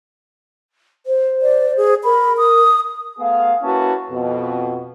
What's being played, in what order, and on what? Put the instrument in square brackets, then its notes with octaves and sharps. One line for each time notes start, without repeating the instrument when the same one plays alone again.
[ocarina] C5
[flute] D5
G#4
[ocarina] A#4 [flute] B5
[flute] D#6
[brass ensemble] A3 B3 G#4 F5
A#3 C#4 E4 F#4 B4 A5
F2 B2